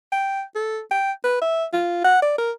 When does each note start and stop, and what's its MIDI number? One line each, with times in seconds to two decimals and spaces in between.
0.12 0.43 79
0.55 0.80 69
0.91 1.12 79
1.24 1.40 71
1.42 1.65 76
1.73 2.04 65
2.04 2.22 78
2.22 2.34 74
2.38 2.51 70